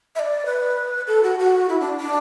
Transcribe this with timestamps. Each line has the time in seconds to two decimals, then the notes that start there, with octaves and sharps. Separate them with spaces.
0.15 E5
0.19 D5
0.45 B4
1.07 A4
1.23 F#4
1.39 F#4
1.69 E4
1.80 D4
2.00 D4